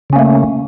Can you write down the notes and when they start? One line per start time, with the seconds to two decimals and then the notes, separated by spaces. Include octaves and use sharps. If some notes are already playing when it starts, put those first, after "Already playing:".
0.10 C#3
0.13 C#4
0.16 A#3
0.19 A3